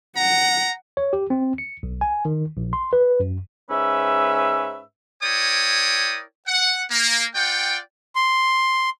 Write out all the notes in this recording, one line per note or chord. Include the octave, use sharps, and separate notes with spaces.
F#5 A#5
C#5
G4
C4
C#7
B1
G#5
D#3
A#1
C6
B4
F#2
G#2 C#4 B4 E5 E6
E4 A#4 C#5 D5 G5 D#6
F#5
A#3
F4 D5 F#5 G5
C6